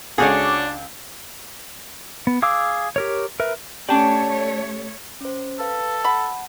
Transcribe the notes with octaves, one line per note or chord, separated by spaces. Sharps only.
C#2 D4 F#4 G#4 A4 C#5 D5 G6
B3
G#4 F5 D6 E6
G4 A#4 C#5
A#4 B4 E5
A3 C#4 G4 C#5 D5 A5
C#4 C5
A4 B4 F5
F#5 A5 B5